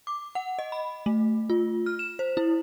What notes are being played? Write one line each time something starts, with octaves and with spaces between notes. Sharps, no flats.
D6
F#5
D#5
B5
A3
F4
F6
E7
C5
E4